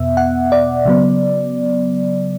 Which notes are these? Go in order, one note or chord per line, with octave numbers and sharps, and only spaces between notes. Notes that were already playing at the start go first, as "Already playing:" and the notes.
Already playing: E2 B2 B3 E5
F#5
D5
C#3 F#3 B3